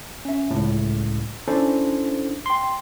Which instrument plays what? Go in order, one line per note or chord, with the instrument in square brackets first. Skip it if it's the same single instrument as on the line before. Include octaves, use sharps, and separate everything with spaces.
[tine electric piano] C#4 E5
C#2 A2
C#4 D4 E4 A4 C5
G5 C6